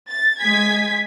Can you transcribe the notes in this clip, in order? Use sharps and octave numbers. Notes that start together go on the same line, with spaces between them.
A6
G#3 G#5 G#6 B6